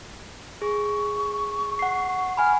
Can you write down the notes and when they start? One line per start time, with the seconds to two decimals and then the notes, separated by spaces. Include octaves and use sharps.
0.62 G#4 C#6
1.79 F#5 C7
2.37 F#5 G#5 B5 F6